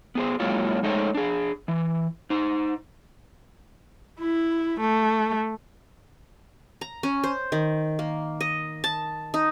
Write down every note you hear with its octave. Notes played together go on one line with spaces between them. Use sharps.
B3 G#4 C5
F#3 G#3 A#3 E4 F4 C#5
G#3 A3 D#4 C5 C#5
D4 G#4
E3
D#4 C5
E4
A3
A#5
C#4
C5
D#3
A#3
D#5
A5
D#4